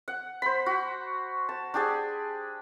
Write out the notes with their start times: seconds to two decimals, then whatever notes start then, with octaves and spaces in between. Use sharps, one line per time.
0.08 F#5
0.42 C5 B5
0.66 F#4
1.49 A5
1.74 D4 G4 G#4 D5